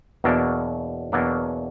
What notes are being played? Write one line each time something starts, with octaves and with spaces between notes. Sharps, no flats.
E2 B2 F#3 A#3 D4
E2 B2 F#3 A#3 D4